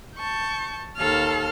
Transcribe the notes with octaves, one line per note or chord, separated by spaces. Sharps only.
A5 C#6 G6
D#2 A4 F5 A5 F6